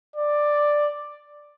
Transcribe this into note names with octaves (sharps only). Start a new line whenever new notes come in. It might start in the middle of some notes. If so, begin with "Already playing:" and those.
D5